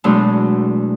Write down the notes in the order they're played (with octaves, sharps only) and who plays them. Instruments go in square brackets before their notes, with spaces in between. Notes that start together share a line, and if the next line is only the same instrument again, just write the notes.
[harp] E2 B2 F#3 G#3 A3 D4